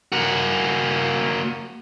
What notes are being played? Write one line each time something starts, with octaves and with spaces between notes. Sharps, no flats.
A#3 F#4